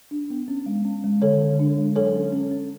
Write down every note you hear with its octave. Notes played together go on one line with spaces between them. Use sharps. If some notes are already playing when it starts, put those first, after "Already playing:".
D4
B3
C#4
G#3
C#4
G#3
D3 A4 C#5
D3
D4
G#3
F#3 A4 C#5
C#4
C#4
C#4